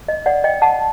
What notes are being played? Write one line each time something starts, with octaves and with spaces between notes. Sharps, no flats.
D#5
D5 F#5
D#5 G5
F#5 A5